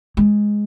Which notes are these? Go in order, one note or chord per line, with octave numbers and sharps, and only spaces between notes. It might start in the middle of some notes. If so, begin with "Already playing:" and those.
G#3